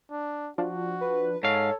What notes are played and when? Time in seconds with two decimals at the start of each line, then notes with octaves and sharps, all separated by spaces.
0.11 D4
0.58 F3 D4 F4 F#4
1.01 B4
1.43 G#2 A4 C#5 F5